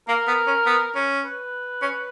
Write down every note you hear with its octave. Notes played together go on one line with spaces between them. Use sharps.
A#3 A#4
B3
C#4
B3
C#4
B4
C#4